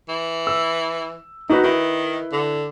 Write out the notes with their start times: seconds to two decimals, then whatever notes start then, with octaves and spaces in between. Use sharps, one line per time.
0.09 E3
0.47 E6
1.49 D#3 D#4 F#4 B4
1.64 D#3 E4 B4
2.32 D3